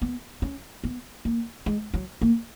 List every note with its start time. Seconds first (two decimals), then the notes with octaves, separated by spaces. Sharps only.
0.02 B3
0.42 C#4
0.84 B3
1.25 A#3
1.66 G#3
1.94 F#3
2.22 A#3